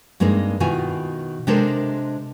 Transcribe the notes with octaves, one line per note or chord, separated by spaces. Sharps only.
G2 G#3 A#3 C4 D#4
B2 D#3 E4 F4 G#5
C3 G#3 D4 A4 A#4 C5